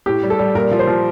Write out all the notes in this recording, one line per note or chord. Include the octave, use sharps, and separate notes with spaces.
A2 G4
G3
A4
G3
A#2 A#4
F3
C5
F3